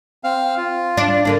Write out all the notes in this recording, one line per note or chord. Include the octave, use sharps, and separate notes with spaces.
C4 F5
F4
D4
D3 A#3 D4 A4